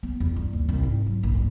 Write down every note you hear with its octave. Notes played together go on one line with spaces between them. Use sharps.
B3
E2
G2
D#2
C2
G#2
F#3
A#1
G2